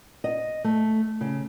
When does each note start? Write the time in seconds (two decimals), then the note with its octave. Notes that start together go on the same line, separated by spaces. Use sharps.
0.24 D#5
0.64 A3
1.21 C#3